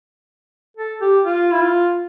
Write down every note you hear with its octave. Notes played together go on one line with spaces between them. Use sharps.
A4
G4
F4
E4
F4